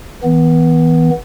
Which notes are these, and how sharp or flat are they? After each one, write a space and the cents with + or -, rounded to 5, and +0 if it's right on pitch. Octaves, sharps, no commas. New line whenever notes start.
E3 -30 B3 +0